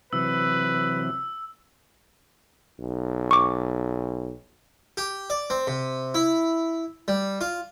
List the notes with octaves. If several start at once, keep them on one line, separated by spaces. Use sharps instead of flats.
C3 E3 F#3 B4 E6
B1
C#6 D6
G4
D5
C4
C3
E4
G3
F4